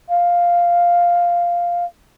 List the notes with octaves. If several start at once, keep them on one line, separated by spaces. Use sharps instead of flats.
F5